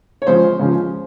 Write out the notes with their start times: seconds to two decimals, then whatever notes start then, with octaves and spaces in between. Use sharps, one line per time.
0.22 C#5
0.27 C#2 C#3 F3 C5
0.59 C#2 C#3 F3